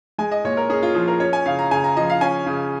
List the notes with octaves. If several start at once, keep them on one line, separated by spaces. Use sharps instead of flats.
G#3 G#5
D#5
A#2 C#5
A#4
C#4 G#4
F4
F3 G#4
A#4
C#4 C#5
G#5
C#3 F5
A#5
C#3 G#5
A#5
F3 D#5
F5
C#4 G#5
C#3